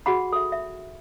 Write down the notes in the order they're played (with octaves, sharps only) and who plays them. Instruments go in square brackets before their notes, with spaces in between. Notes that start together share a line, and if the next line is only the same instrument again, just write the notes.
[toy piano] F#4 G#4 F#5 B5
A4 E5
E5